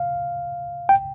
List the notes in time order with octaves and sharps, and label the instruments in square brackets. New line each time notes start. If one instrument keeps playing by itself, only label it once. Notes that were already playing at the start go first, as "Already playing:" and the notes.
Already playing: [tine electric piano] F5
G5